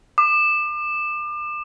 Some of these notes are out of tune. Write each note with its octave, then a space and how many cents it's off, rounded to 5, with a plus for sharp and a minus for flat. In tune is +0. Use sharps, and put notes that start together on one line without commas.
D6 +35